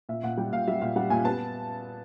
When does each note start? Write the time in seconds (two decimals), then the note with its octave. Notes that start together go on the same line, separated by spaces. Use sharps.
0.09 A#2 E5
0.23 A#2 F#5
0.37 G3 G5
0.52 A#2 F5
0.68 G3 E5
0.81 A#2 F5
0.96 G3 F#5
1.10 A#2 G#5
1.25 B3 A5